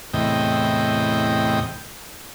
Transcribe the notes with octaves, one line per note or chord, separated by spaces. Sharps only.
E2 A2 C3 D#5 G5